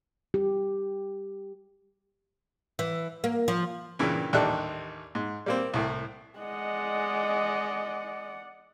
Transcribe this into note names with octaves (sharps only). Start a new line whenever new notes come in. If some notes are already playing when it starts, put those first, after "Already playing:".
G4
E3
A#3
F3
G2 A#2 C#3 E3
A1 D#2 G3 D4 A4 F#6
G#2
G3 A#3 C4
C2 A2
G#3 D5 D#5 F#5